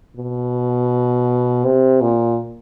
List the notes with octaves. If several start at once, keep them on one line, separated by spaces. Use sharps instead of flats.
B2
C3
A#2